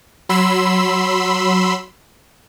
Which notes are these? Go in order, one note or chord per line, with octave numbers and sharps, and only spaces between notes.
F#3 B5 C6 E6